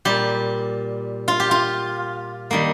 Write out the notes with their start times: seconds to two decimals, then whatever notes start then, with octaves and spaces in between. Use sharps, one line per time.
0.05 A#2 G3 G4
1.28 F4
1.40 G4
1.51 F4
2.51 D#3 G3 A#3